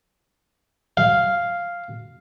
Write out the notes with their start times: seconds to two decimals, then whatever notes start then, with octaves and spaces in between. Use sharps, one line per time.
0.97 F5